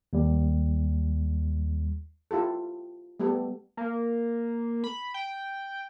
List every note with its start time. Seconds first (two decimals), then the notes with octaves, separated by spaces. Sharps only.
0.13 D#2 G3
2.31 E4 F4 G4 A4
3.20 G3 A3 B3 G4 A4
3.77 A#3
4.84 B5
5.14 G5